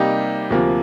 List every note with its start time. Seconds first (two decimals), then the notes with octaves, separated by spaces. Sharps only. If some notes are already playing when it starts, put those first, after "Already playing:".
Already playing: C3 G3 A#3 D#4 G4
0.50 D2 C3 F3 A#3